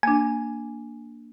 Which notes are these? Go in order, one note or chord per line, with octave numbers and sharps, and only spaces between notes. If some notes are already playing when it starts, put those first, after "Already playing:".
A#3 D4 G#5